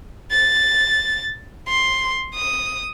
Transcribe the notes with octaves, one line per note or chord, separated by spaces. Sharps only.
A6
C6
D#6